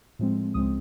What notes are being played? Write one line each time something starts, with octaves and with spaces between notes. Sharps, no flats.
A2 F3 G#3 C4
C#2 C#3 F3 G#3 C4 D#6